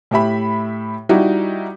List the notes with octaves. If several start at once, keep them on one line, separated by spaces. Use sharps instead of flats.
A2 G4 E5 B5
G3 D#4 E4 F#4